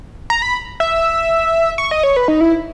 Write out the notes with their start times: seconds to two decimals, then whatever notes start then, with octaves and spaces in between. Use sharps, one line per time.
0.30 A#5
0.42 B5
0.80 E5
1.78 C#6
1.91 D#5
2.03 C#5
2.16 B4
2.28 D#4
2.41 E4